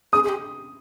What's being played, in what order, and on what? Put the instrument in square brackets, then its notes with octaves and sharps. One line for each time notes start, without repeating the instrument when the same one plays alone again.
[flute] G#4 [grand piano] D#6
[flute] G#4
G4